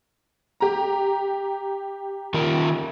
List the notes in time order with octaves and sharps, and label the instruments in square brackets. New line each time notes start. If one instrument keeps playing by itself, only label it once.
[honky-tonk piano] G4 A#5
[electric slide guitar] D#3 F4 A#4